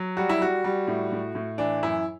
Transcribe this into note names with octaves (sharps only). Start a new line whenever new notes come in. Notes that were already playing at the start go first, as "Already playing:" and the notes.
Already playing: F#3
G3 F#4
E4
G3 F#4
G3
A2
A2
A2
E3 D4
F#2 E4